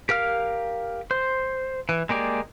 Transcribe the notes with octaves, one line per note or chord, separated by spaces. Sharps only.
G4 A#4 F5 F6
C5
E3
G#3 A#3 G4 D5